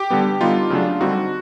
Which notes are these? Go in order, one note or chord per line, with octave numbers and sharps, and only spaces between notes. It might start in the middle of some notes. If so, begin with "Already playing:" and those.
Already playing: G4
D3 G3 B3
D3 G3 B3 D#4 F4
C#3 F#3 A3 D4
D3 G3 C4 D#4 F#4